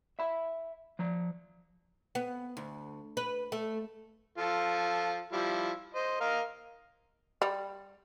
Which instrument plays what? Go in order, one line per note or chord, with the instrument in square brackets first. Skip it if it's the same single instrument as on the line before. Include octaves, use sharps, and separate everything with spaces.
[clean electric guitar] E5 B5
F3 A#5
[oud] B3
D2
B4
A3
[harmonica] F3 F4 A4
F3 G3 E4
C5 D#5
A#4 D#5 F5
[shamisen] G3